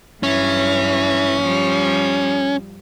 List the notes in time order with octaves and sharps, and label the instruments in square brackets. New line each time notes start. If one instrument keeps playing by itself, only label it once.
[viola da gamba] G2 E3 F#3 [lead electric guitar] C#4
[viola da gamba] F3 G3